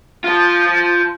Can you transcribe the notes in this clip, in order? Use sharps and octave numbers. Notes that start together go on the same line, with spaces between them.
F3 F4